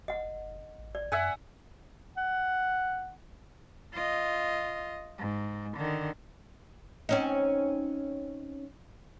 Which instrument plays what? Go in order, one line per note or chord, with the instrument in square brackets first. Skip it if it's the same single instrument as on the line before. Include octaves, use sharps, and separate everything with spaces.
[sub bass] F#1 [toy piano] D#5 F#5
[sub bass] A1
[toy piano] D5
[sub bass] F#2 [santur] E5 F#5 G#5
[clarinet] F#5
[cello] F4 D#5
G#2
D3 D#3
[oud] C4 C#4 D#4